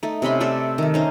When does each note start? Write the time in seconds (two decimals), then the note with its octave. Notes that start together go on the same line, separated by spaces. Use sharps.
0.03 A3 D#4
0.22 C3 C#4 B5 C6
0.40 A3 A4 D5 E5
0.78 D#3 A3
0.94 C#4 D#4 C5